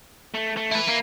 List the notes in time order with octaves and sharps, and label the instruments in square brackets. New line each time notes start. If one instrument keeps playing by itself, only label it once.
[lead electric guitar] A3
A3
[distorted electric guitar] E4 B4
[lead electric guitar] A#3